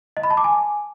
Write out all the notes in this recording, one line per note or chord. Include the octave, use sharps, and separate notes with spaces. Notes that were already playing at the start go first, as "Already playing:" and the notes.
D#5
B5
A5
D6
G#5